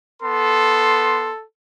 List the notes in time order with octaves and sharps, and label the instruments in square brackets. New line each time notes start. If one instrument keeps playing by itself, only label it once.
[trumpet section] B3 C6 [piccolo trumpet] A4